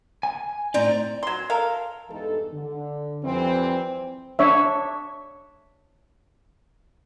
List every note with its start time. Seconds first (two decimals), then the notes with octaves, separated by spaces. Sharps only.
0.23 G#5
0.74 A2 C4 D#4 D5 A#5
1.23 F#3 C6
1.50 A4 A#4 F5
2.09 E2 G2 E3 G#3 D#4 A4
2.53 D3
3.23 F2 E3 G3 C4
4.39 D4 C#5 E5